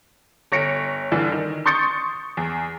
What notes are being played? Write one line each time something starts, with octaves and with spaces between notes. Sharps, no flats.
G1 C#5 A#6 C#7 D7
G2 D3 E3
D#3
C6 C#6 D#6 G6 A6 C#7
E2